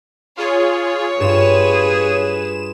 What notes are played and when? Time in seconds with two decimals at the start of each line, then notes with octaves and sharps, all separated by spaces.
0.37 F4 G#4 C#5
1.20 G2 F4 G#4 B4 E7